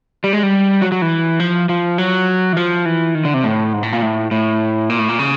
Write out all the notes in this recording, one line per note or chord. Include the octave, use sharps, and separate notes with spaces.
G3
G#3
G3
F#3
F#3
E3
F3
F3
F#3
E3
F3
E3
D#3
D3
C3
A2
G#2
A2
A#2
A2
A2
A#2
A2
A#2
C#3